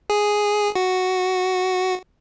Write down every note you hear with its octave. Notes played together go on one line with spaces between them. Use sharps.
G#4
F#4